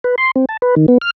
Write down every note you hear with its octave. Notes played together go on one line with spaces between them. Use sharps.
B4
C6
C4
A5
B4
D#3
B3
F6